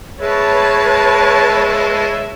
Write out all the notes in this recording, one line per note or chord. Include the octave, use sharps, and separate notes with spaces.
G#3 B4 C#5 E5 A5